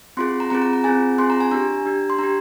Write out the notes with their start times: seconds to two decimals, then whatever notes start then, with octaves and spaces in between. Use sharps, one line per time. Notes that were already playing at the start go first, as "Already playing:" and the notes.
0.17 C4 F4 G#4 C6
0.40 A#5
0.50 C4 F4 G#4 A#5
0.62 A#5
0.73 A#5
0.84 C4 F4 G#4 G#5
1.18 C4 F4 G#4 C6
1.30 A#5
1.40 G#5
1.51 D4 G4 A#5
1.85 D4 G4
2.10 C6
2.18 D4 G4 A#5